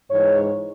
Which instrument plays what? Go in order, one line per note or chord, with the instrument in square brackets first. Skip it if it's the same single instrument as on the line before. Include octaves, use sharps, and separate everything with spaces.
[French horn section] G#2 E3 G#3 C#5